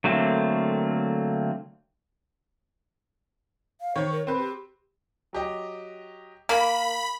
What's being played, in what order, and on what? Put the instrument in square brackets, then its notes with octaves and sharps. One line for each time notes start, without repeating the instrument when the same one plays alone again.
[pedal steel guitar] D3 F#3 A3 A#3 C4
[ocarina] F5
[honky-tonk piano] D#3 C#5 [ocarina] C5
[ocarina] A#4
[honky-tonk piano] C4 B4 [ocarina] A#4
[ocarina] G4
[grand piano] F#3 G4 D#5
[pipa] A#3 [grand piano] A#5 [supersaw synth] B5